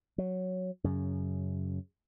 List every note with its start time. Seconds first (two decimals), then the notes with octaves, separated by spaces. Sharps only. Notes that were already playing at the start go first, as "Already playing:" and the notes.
0.18 F#3
0.84 F#2 C#3